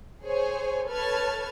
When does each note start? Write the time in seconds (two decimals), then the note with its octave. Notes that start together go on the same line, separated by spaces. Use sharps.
0.23 G#4 C5 C#5 G#5
0.88 A4 B4 C#5 A5 F6 G#6